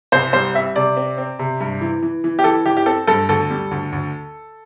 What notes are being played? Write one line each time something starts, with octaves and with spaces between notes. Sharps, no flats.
C2 C5
G3 C5
C4 E5
C3 D5
C4
C4
C3
G2
E3
E3
E3
G4
E3 A4
E3 G4
G4
C4 A4
G2 A4
D2 A4
G3
D2
D2